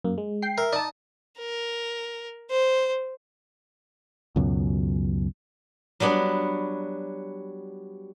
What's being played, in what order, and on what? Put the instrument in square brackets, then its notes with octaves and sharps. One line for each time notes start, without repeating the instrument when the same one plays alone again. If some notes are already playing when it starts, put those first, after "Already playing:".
[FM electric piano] F#2 A#3
G#3
[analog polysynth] G5 C7
[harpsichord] A#4 [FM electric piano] E5
[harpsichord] D#4 [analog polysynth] D5 A5
[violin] A#4
C5
[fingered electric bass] C#2 F#2 B2
[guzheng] F#3 G3 B3 D4